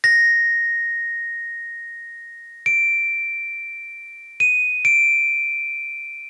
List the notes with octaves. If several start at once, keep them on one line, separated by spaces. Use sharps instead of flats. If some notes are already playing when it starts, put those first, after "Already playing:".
A#6
D7
D#7
D7